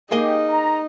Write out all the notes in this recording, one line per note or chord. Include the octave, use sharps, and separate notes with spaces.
A#3 D#4 G4 G#4 D#5
A#5